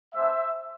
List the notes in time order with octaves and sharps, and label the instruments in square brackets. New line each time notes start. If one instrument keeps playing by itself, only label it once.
[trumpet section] G#3 B3 D4 C5 E5